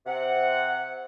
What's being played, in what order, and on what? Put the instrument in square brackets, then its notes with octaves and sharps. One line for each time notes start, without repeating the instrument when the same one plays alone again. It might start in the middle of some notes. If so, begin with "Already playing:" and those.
[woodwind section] C3 F#5